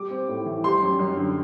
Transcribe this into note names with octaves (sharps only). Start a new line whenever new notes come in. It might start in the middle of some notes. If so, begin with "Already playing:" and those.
Already playing: G3 D6
C4
A2
E3
G3 C6
F#2
F#2
D3